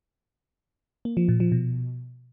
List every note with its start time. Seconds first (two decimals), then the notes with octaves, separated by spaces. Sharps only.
1.05 A#3
1.17 F3
1.29 A#2
1.40 F3
1.52 B2